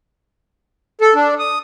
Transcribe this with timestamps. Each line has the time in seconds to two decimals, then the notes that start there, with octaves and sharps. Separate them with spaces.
1.01 A4
1.15 D4
1.39 D#6